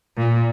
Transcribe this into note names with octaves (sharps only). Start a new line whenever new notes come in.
A#2